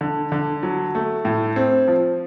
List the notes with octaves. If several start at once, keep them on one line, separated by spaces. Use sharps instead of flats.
D3
D3
F#3
A3
A2
C4
F3